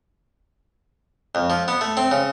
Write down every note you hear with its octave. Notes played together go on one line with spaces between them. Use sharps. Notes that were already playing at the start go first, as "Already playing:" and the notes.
F2
F3
B3
A3
C4
C#3